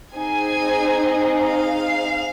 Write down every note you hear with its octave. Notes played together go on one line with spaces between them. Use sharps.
C4 D#4 G#4 G#5
F5